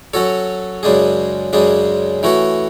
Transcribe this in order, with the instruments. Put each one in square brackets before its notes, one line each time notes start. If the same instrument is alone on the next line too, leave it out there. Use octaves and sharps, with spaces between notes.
[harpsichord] F#3 C#4 F#4 A4 C#5
F#2 C#3 G#3 D4 G#4
F#2 C#3 G#3 D4 G#4
E3 A3 C#4 F#4 C#5